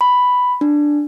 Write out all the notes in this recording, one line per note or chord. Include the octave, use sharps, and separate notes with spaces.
B5
D4